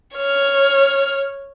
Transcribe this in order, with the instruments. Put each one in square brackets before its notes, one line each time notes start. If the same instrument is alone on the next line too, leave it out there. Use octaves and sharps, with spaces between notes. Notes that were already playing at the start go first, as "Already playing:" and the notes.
[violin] C#5 F6